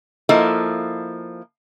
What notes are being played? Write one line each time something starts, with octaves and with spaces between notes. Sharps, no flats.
F3 A#3 E4 A4 D#5